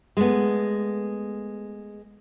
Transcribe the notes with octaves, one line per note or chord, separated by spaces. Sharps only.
G#3 A3 B3